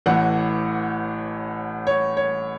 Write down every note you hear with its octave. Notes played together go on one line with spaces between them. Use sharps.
A1 A2 E3 F#5
C#5
C#5